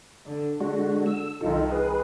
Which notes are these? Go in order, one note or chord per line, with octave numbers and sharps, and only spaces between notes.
D3
D3 G#3 D4 F#4
E6
C2 D#3 D#4 F4 A4
G#4 B4